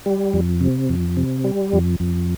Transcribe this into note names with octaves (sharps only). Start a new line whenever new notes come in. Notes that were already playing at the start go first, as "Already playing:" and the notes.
G3
F2
C3
F2
C3
G3
F2
F2